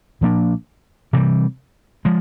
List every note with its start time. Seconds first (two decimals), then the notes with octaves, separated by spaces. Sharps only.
0.21 A#2 F3 A#3 D4
1.13 C3 E3 G3
2.05 F3 G#3